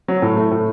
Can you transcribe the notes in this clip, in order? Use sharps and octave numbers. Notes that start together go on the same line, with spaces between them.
F#3
A2
A3
A2